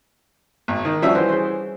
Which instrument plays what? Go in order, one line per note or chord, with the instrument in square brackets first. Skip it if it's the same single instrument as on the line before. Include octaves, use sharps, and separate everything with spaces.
[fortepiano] G#1
D#3
[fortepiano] F3 D4 E5 [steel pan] G3 C#4 F#4
[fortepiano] E3 [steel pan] C5
[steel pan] G#4 C5